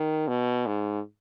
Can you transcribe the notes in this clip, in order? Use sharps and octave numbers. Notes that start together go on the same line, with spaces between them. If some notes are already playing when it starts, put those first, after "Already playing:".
Already playing: D#3
B2
G#2